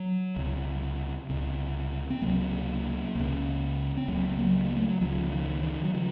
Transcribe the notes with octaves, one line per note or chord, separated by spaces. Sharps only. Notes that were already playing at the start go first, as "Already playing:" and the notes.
Already playing: F#3
C#2 C3
C#2 C3
C4
C#2 C3 F#3 A#3
C#2 C#3
C4
C#2 C#3 F#3 A#3
F#3 A#3
A#3
A3
F#3
C#2 C#3 F3
D#3
D#3
F#3
C#3 F3